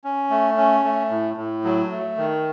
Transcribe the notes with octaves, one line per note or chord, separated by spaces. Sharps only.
C#4
A3
C#4
A3
A2
A2
F#3
A3
D#3